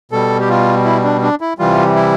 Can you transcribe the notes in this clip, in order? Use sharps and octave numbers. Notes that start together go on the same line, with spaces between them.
B2 G3 A4
G4
F4
E4
D4
D4
E4
C3 E3 G3 F4
E4